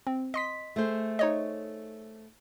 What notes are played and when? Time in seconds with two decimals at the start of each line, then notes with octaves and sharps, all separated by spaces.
0.07 C4
0.34 D#5 C6 B6
0.76 A3 G#4 C5
1.19 D#4 C#5 D#5